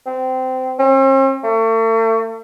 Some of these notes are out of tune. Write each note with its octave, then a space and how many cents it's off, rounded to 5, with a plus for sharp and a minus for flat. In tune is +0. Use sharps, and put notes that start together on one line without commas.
C4 -20
C4 +45
A3 +40